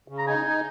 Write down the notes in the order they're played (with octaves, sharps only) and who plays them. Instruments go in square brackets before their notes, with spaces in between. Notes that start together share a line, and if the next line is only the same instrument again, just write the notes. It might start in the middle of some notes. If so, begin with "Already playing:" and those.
[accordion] C#3
[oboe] A#5
[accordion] D#4 [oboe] G#5
[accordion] D#4